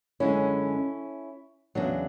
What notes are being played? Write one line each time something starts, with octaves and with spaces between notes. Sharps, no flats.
F#2 D3 G#3 C#4 E4
E2 C#3 F#3 D4